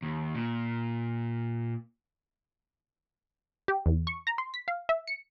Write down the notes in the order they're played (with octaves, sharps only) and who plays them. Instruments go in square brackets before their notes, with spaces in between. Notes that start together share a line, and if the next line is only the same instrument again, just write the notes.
[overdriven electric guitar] D#2
A#2
[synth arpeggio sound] G4
E2
C#6
A#5
C6
B6
F5
E5
C#7